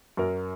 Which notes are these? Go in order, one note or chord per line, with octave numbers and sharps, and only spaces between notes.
F#2 A#4